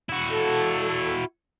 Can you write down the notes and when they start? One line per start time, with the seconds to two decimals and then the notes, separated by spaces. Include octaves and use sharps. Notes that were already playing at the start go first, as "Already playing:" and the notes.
0.09 E4 F#4
0.30 A4